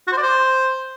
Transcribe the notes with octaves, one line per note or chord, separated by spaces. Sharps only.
F#4
C5
D5
C5